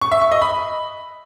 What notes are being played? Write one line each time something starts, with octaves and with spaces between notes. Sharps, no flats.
C#6
E5
C#6
D#5
B5